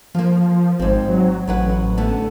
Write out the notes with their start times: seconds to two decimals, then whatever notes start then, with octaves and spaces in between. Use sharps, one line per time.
0.15 F3 A#3 F4
0.79 G#1 G#2 C4
1.08 F#3
1.48 A1 F#3 B4 F#5
1.98 D3 A3 B3